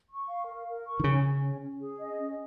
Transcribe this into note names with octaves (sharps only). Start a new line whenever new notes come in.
C#6
F5
A#4
A#4
C#6
D#3
C#3 C#4
C#4
C#4
C#4
G#4
D#5
C#4